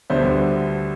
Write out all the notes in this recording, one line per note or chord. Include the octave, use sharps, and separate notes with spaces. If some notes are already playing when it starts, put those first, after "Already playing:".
D2 D3 G3 B3 C5 E5